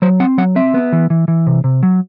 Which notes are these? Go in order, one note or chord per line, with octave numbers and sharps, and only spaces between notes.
F#3 C5
C4 F#5
F#3 F#5
C4 E5
B3
E3
E3
E3
C3
C3
F#3